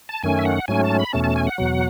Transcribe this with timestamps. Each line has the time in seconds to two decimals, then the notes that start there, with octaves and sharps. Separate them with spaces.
0.09 A5
0.23 F#2 D#3 A3 C#4 G#5
0.39 E5
0.45 F#5
0.68 G#2 F#3 A3 C#4 G#5
0.84 A5
0.99 B5
1.13 E2 B2 A3 C#4 A5
1.24 A5
1.36 G#5
1.47 F#5
1.58 E2 B2 F#3